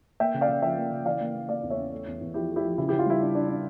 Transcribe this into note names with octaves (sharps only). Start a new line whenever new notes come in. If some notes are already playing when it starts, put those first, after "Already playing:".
A#3 E5 G5
C#3
D5 F5
C#3
F3 E5 G5
A#3
C#3
E3 D5 F5
A#3
A#3
A#3 D5 F5
E2
C#5 E5
C#4
A3
E2
E2
F3 E4 G4
A3
E4 G4
F3
C#3 E4
C#3 E4 G4
F4
G3 E4
D4
D4
D4